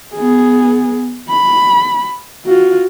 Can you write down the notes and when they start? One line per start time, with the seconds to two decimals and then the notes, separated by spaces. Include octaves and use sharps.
0.15 B3 G#4
1.29 B5
2.46 F4 F#4